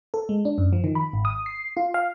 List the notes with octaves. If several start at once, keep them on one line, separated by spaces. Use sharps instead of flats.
A4
G#3
D4
F#2
F3
D#3
B5
G#1
D#6
C7
F4
F5